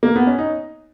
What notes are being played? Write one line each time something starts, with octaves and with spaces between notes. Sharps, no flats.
A#3
B3
C#4
D#4